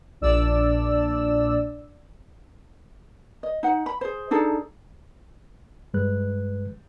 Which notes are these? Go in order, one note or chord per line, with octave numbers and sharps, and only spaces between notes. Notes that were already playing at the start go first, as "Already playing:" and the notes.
A#1 D4 D5 E6
D#5
D#4 F#5
B5
G#4 C5
D4 D#4 G#4 A4
G2 G#3 B4 F#6